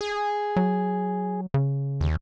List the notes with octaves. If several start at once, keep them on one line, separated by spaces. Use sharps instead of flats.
G#4
F#3
C#3
D#2